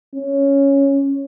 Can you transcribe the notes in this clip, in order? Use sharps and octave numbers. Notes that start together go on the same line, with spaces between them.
C#4